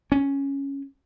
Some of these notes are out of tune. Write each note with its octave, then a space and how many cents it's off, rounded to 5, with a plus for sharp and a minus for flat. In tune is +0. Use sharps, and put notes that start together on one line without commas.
C#4 +0